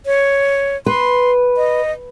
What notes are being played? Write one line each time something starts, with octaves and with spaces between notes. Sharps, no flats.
C#5
B4 C6
D#5